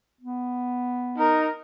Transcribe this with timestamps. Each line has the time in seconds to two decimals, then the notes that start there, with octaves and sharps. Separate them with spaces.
0.21 B3
1.18 D#4 A#4